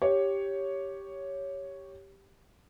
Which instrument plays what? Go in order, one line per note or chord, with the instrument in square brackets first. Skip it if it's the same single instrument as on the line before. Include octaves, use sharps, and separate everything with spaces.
[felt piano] G4 C#5